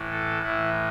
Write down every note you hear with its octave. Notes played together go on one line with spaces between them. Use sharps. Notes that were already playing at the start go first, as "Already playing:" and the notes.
Already playing: A2 E3
A4
A2 E3 E4